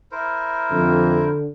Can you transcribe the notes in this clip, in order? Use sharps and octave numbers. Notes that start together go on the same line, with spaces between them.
E4 A#4 C5
F2 D3